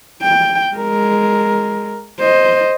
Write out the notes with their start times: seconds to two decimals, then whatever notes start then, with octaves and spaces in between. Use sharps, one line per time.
0.22 G5
0.74 G#3 A#4
2.20 C5 D#5